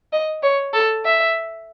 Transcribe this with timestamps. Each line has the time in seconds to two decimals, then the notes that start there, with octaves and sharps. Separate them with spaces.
0.13 D#5
0.43 C#5
0.74 A4
1.05 E5